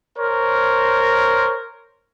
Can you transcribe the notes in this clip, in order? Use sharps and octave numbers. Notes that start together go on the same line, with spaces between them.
A#4 C5 C#5